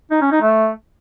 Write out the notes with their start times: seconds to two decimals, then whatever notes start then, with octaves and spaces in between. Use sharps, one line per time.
0.11 D#4
0.21 C#4
0.31 D#4
0.42 A3